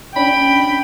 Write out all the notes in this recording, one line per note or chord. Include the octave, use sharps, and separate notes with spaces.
C#4 D4 G5 B5